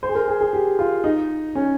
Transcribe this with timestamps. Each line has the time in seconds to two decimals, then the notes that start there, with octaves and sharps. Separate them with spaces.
0.03 C5
0.09 G#4
0.15 A#4
0.28 G#4
0.41 G#4
0.53 G4
0.79 F4
1.04 D#4
1.55 C#4